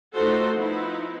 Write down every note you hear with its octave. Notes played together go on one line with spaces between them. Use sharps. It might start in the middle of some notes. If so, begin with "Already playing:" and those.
A3 D#4 F4 F#4 A4 C5
F3 B3 D#4 E4